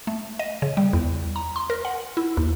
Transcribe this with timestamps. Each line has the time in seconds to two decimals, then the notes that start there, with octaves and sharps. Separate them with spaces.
0.07 A3
0.39 D#5
0.62 C#3
0.77 G3
0.93 E2
1.36 A#5
1.56 C6
1.70 A#4
1.85 F#5
2.17 E4
2.37 D#2